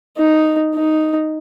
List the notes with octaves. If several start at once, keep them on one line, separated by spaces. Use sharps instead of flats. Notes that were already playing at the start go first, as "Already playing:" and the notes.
D#4
D#4